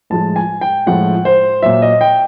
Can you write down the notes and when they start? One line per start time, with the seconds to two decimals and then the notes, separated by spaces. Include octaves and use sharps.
0.10 A2 F3 G#3 A5
0.36 G#5
0.61 G5
0.86 A2 F3 G#3 F#5
1.25 C5
1.63 A#2 F#3 E5
1.82 D#5
2.01 G5